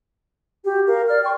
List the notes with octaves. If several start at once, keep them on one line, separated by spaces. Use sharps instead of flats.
F#4 G4
A#4 F5
D5 F6
G5 C6 C#6